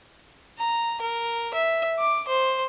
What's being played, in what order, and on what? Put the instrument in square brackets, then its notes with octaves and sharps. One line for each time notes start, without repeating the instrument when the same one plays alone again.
[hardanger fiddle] A#5
A#4
E5
D6
C5